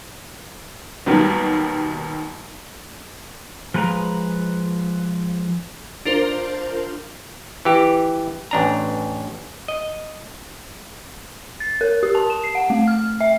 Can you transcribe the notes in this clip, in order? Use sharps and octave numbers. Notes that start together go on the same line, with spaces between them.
D#2 B2 D#3 F#3 G3
F3 G#3 B4 G5 A#5
D4 F4 A#4 C5
E3 G4
A1 D4 A#5
D#5
A6
A#4
G4
A5
E7
C7
F#5
A3
F6
E5